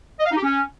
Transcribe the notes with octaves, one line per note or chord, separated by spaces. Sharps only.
D#5
F5
D#4
G4
C#4